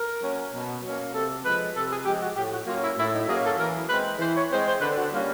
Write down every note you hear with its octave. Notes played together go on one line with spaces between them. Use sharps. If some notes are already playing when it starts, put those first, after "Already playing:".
Already playing: A#4
F#3 A#3 C#4
B2
F#3 A#3 C#4
C3 A4
F3 G#3 B4
C3 A4
G#4
F3 G#3 G4
F#4
A2 G4
F#4
F#3 A#3 C#4 F4
E4
A2 E4
D#4
F#3 A#3 C#4 G#4
A4
E3 A#4
G#3 C4 B4
E3 C5
C#5
G#3 C4 C5
C5
D3 B4
F#4
G3 A#3 C#4 F4